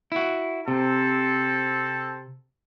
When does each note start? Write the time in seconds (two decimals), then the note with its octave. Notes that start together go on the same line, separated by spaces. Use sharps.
0.12 E4 F#4
0.68 C3 C4 A4